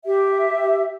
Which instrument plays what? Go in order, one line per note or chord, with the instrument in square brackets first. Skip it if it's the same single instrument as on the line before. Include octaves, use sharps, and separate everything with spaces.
[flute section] G4 E5